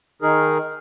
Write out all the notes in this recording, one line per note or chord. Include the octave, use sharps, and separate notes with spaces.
D#3 D#4 G#4 A#4